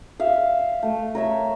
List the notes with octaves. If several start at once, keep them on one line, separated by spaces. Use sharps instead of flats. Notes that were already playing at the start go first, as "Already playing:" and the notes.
E5 F5
A3
A#4 C#5 E5